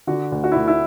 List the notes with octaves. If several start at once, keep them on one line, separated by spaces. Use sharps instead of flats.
D3 F#4
D2
F#4
E4
D2
E4